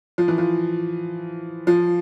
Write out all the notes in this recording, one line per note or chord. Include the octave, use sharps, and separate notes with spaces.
F3
E3
F3
F3